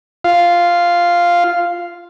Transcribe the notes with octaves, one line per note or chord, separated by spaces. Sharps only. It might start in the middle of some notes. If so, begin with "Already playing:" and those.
F4 F5